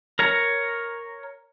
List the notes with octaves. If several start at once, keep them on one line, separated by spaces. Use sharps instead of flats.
A#4 C#5 A#5